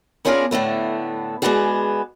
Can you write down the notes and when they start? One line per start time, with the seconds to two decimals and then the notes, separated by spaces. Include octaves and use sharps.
0.25 B3 C#4 D4 F4 G#4 A#4
0.51 A2 D3 A3 B3
1.42 G#3 A3 B3 D4 F#4 G#4